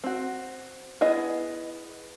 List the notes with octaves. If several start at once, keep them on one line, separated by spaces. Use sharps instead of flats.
C4 F#4
B3 E4 G#4 D#5